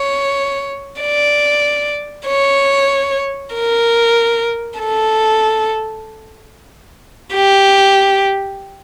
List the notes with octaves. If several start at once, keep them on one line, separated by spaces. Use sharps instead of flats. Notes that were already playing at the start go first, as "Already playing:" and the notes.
Already playing: C#5
D5
C#5
A#4
A4
G4